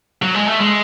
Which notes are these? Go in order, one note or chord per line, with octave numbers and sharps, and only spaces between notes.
F#3
G#3
A3
G#3